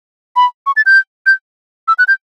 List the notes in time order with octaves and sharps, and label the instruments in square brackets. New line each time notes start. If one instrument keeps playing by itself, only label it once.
[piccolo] B5
C#6
A6
G6
G6
E6
F#6
G6